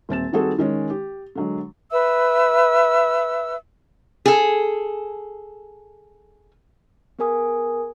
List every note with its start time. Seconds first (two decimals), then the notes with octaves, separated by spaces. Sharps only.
0.09 D#1 C4 A6 E7
0.33 D#3 G3 C4 F#4 G#4 A4
0.58 D#3 G#3 C#4
0.90 G4
1.35 D3 F#3 G#3
1.91 B4 E5 E6
4.26 G#4 A4
7.19 B3 G#4 A#4 G#5 D#6